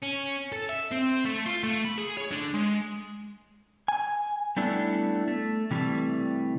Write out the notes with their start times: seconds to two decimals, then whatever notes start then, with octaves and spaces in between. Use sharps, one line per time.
0.03 C#4
0.52 A4
0.69 E5
0.92 C4
1.26 A3
1.46 F4
1.63 A3
1.85 B5
1.98 G#4
2.17 C#5
2.31 D3
2.54 G#3
3.88 G#5
4.57 G3 A3 B3 D4 E4
5.28 A3
5.71 C3 E3 G3 A3